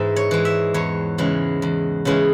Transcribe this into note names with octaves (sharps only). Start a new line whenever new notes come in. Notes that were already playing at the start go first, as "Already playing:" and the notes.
Already playing: G#2 E3 G#3 E5
C#5
E3 G#3
E5
E2 C#5
C#3 E3 G#3
E2
C#3 E3 G#3